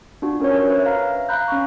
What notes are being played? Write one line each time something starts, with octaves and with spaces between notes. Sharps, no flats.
D4 F4 F#4
C#4 A#4 C5 C#5
B4 E5
F5 A#5 F6
F5 A#5 B5 F#6 G6
C#4 A#5 C#6